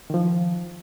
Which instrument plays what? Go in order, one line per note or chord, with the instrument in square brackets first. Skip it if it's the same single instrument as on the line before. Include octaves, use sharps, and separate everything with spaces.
[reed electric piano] D#3 F3